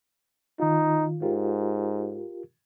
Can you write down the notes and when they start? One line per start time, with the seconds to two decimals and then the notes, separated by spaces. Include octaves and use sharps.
0.60 D#3 D#4 F4
1.22 G#2 F4 G4 A#4